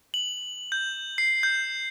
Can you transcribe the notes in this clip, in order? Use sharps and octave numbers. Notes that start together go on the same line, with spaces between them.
F#7
G6
C7
G6